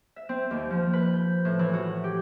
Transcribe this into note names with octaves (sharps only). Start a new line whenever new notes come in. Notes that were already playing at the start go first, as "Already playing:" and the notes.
E5
C4
D#2
F3
B4
G6
A2
E3
F#4
G4